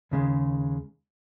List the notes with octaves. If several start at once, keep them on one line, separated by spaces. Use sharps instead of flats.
D#2 C#3 G#3